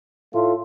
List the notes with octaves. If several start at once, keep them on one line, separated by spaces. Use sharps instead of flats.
A2 A3 F4